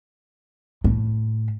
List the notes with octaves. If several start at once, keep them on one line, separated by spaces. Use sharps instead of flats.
A2